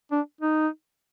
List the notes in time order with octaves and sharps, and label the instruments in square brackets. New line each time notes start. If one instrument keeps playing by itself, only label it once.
[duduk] D4
D#4